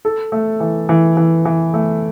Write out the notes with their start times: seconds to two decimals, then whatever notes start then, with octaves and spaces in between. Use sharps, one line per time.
0.05 A4
0.32 A3
0.60 E3
0.89 E3
1.17 E3
1.45 E3
1.74 A3